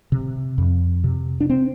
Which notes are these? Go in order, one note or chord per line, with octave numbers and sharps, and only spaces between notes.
C3
F2
C3
D4
C4